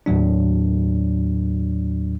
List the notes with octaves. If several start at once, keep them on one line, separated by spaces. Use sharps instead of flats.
D#2 A2 F#3 D4